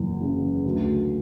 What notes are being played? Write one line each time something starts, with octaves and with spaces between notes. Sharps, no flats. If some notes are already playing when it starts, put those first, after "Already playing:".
Already playing: F#1 E2 F#3
C#3
D2